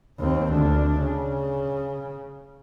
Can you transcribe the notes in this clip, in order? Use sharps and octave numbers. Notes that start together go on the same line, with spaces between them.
D#2 C4
D2 D4
C#3